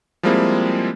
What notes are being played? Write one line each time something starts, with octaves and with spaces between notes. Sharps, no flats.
F3 G3 G#3 A#3 C4 E4